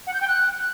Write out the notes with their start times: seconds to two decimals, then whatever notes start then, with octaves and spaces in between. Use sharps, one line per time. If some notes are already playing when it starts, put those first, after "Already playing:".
0.07 F#5
0.14 G6
0.21 G5
0.28 F#6